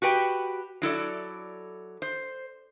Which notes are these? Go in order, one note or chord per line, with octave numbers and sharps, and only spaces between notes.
F#4 G4 B4 G5
F#3 E4 A4 D5
C5